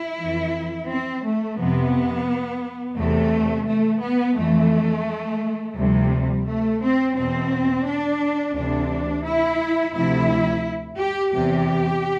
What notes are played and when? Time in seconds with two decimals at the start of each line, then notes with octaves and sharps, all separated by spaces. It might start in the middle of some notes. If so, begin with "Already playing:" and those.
Already playing: E4
0.17 F2 E3
0.87 C4
1.23 A3
1.57 F2 C3 F3 B3
2.96 E2 C3 E3 A3
3.66 A3
4.01 B3
4.36 F2 E3 A3
5.76 D2 C3 F3 G3
6.45 A3
6.81 C4
7.15 E2 B2 C4
7.85 D4
8.54 D2 C3 E3 D4
9.24 E4
9.94 D2 C3 F3 E4
10.99 G4
11.33 E2 C3 E3 G4